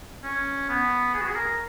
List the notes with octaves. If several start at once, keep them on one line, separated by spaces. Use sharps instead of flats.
C#4
B3
G#4
F#4
G#4
A#4